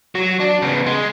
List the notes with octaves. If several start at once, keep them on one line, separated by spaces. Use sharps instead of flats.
F#3
D4
C#3 B3
G#3